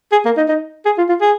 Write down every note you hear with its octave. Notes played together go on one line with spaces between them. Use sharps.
G#4
A#3
D#4
D#4
G#4
F4
F4
G#4